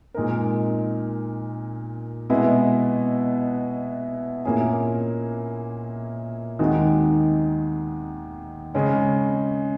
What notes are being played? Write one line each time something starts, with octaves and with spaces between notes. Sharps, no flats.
A#2 G#3 D#4 A#4
B2 G#3 B3 E4
A#2 A#3 C#4 E4 G#4
D#2 D#3 G#3 D#4 F#4
C#3 G#3 C#4